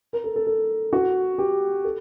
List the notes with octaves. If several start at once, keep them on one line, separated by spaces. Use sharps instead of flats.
A#4
A4
A4
A4
F#4
G4
A4